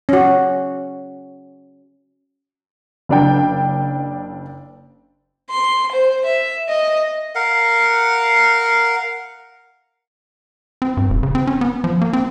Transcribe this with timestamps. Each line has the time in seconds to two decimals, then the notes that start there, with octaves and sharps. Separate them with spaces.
0.09 C#4 F#4
3.09 F#1 D4 G5
5.50 C6
5.92 C5
6.25 E5
6.69 D#5
7.35 A#4 F5 F#5
10.82 C4
10.97 G2
11.10 E1
11.23 C#3
11.35 C4
11.47 C#4
11.61 B3
11.84 F3
12.02 A#3
12.13 C4